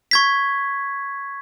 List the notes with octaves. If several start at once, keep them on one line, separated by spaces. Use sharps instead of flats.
C#6 G#6 B6